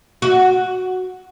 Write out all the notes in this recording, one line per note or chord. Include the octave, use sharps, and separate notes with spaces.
F#4